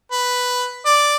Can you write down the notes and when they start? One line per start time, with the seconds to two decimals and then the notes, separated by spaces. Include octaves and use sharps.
0.12 B4
0.86 D5